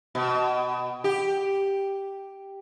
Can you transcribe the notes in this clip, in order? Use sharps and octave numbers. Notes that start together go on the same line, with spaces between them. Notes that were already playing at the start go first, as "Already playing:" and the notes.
B2
G4